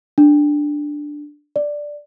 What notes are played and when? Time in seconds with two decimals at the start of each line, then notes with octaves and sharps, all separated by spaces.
0.18 D4
1.56 D5